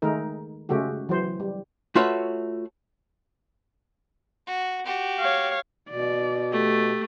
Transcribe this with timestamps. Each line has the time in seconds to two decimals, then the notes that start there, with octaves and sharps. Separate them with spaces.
0.02 D#3 G#3 A3 D#4 A#4
0.69 C#3 G#3 A3 F#4 G4
1.09 E3 F#3 C5
1.40 G3
1.95 A3 F4 F#4 B4 C#5 E5
4.47 F#4
4.85 F#4 G4
5.20 C#5 F5
5.90 B2 D5
6.52 A3 G4